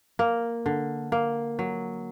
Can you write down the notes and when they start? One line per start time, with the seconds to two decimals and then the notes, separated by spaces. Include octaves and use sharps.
0.19 A#3
0.66 D3
1.12 A#3
1.59 F#3